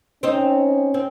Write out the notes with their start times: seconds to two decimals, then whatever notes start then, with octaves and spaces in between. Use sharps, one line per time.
0.23 C4 C#4 D#4
0.94 C4